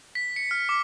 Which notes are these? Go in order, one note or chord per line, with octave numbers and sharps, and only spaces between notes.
B6
C#7
F6
D6